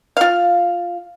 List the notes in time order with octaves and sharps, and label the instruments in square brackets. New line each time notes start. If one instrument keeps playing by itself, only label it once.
[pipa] F4 F5